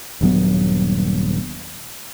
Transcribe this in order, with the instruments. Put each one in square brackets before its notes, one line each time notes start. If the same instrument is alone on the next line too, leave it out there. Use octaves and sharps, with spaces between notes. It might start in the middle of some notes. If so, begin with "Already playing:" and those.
[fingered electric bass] D#1 G2 F#3 B3